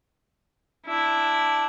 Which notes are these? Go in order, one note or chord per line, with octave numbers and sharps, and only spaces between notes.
D4 E4